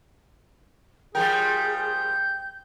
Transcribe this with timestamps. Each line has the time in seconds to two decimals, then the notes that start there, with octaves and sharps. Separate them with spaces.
1.15 F3 G3 G#4 A#4 G5 G6